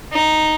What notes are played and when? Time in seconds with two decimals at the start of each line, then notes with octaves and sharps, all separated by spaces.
0.12 D#4